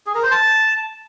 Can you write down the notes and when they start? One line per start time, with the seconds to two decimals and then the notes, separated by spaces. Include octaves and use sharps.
0.06 G#4
0.15 A#4
0.23 C5
0.31 A5